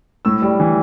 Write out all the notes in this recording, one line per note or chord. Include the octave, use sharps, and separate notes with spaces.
A2 E6
G3
E3